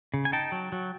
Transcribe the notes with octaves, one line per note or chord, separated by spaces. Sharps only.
C#3
G#5
D#4 G5 A5
F#3
F#3